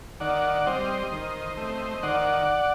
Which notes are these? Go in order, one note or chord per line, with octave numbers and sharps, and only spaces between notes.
D#3 D5 F#5
G3 C4 C5 D#5
D#3
A3 C4
D#3 D5 F#5